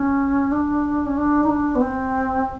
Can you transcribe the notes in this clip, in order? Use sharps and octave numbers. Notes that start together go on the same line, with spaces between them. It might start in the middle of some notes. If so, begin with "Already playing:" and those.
Already playing: C#4
D4
C#4
D4
D#4
D4
B3
C4